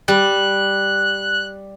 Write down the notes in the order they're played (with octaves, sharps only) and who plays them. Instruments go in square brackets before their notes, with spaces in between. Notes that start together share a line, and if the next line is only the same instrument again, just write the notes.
[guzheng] G3 [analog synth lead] F#6